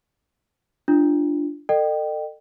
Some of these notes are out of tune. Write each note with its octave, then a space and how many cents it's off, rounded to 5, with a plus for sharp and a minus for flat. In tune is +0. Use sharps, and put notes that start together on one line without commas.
D4 +0 F4 -25
A4 +35 D#5 -40 G5 -15